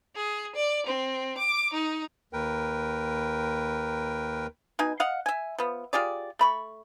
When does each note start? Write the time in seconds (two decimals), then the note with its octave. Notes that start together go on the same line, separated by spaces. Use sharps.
0.16 G#4
0.55 D5
0.87 C4
1.38 D6
1.75 D#4
2.33 D#2 A#4 B4 G5
4.79 B2 D#4 G#5
5.00 D#5 F5 F#5
5.26 E5 G#5
5.58 F3 B3
5.93 F4 G4 G#4 D5
6.39 A3 B5 C#6